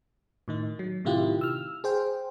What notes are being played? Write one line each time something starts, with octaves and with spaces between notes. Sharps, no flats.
A2 D#3 D#4
F#3
A2 C3 D#3 E4 F4 G4
E6 F6
G#4 C5 G5